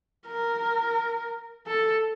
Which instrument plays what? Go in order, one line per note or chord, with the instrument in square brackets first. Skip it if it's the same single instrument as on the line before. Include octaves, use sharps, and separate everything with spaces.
[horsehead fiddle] A#4
A4